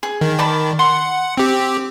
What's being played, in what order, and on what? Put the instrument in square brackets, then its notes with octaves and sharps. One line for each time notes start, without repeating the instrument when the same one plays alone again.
[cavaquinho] G#4
[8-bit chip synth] D#3
[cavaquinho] D5 A5 B5
[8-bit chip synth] F#5 [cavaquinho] C6
[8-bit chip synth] C4 G4